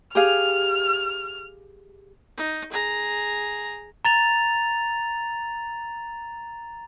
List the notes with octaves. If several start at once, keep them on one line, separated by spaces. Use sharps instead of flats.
G4 G#4 F5 F6
D#4
G#4 A#5
A#5 A6 F7